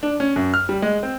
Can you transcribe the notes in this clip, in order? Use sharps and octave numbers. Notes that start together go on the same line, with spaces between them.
D4
C#4
F#2
F6
G3
G#3
C4